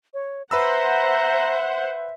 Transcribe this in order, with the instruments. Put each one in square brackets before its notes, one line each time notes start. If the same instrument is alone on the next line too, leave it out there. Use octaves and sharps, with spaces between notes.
[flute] C#5
[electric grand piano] B4 B5 E6 [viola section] C5 F#5 [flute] E5 [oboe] A#5